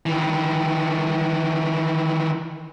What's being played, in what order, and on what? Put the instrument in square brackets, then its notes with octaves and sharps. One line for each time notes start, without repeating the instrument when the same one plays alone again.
[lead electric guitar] D#3 E3